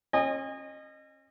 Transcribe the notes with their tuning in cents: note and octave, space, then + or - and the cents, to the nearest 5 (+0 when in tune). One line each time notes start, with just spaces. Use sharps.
C#4 -40 D#5 -20 G#5 -35